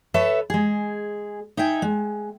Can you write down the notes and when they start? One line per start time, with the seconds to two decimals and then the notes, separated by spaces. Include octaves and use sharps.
0.14 A4 B4 C#5 E5
0.50 G#3 G#4
1.57 D#4 E5 G5 G#5
1.82 G#3